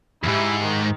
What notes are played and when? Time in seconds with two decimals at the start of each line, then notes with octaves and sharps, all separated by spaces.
0.24 E2 G#2 E4 G4
0.65 D#3